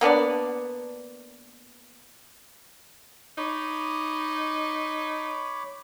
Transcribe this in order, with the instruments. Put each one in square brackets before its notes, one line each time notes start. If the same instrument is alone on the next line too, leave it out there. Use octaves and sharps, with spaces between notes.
[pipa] A#3 B3 D4 D5
[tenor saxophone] D#4 [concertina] C#5 B5 D6